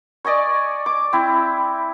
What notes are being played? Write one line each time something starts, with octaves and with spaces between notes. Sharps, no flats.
D5 D#5 G#5 C#6
D6
C4 E4